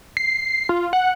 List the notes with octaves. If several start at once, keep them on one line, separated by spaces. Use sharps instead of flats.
C7
F4
F#5